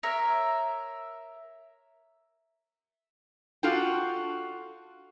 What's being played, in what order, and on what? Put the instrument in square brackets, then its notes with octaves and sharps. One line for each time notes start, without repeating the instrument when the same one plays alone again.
[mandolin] A#4 C#5 E5
[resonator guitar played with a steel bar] D4 F4 F#4 A4 G5